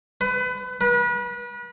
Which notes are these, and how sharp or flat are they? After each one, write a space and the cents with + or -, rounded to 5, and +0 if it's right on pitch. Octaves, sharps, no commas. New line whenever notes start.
B4 +30
B4 -35